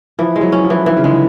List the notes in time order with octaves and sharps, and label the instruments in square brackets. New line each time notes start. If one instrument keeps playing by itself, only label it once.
[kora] E3 [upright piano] F3
[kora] G#3
[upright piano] F#3
[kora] C#4
[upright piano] F3
[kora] E3
[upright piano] D#3 [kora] E3
[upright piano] C#3
[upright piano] D3 [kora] G#3